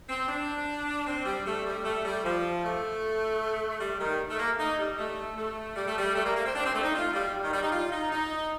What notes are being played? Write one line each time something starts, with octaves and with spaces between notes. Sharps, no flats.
C4
D4
C4
G3
A3
G3
A3
G3
F3
A3
G3
D#3
A3
A#3
D#4
G3
A3
A3
G3
A3
G3
A3
A#3
A#3
C4
D4
C4
A3
D#4
F4
G3
D#3
G3
D#4
F4
D#4
D#4